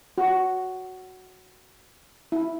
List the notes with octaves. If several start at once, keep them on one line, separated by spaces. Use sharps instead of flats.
F#4
E4